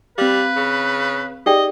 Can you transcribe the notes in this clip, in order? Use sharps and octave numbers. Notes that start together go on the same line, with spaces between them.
G3 C4 B4 F5
C#3
D#4 G4 G#4 D5 D#5 G5